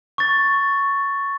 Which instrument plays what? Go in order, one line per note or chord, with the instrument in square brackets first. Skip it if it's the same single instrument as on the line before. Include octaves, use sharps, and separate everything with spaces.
[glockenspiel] C#6 A6